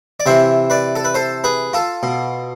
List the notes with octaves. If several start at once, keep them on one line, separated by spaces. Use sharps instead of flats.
D5
C3 E3 C5 E5
B4 D5
A4
B4
A4 C5
G#4 B4
F4 A4
B2